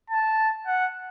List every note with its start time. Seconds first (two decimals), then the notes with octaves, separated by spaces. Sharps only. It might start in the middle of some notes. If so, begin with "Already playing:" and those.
0.10 A5
0.67 F#5